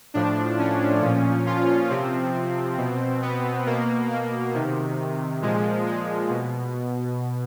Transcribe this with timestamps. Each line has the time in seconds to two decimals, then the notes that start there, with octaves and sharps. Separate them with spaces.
0.14 A2 F3 D4
0.59 C#4
1.02 A#2 F3
1.46 F4
1.90 C3 F3 C4
2.78 B2
3.22 B3
3.66 B2 A#3
4.10 A#3
4.54 C3 D#3
5.42 A#2 F3 G#3
5.86 G#3
6.29 B2